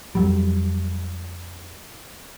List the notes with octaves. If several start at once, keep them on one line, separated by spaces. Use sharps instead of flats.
F2 F#3 G3